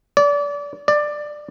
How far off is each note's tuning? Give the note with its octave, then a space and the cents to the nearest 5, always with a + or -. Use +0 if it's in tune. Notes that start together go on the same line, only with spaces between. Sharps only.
D5 -30
D5 +15